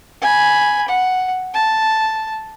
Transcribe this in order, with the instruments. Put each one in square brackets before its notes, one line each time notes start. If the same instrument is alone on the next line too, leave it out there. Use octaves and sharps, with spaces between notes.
[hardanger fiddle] G#5 B5
F#5
A5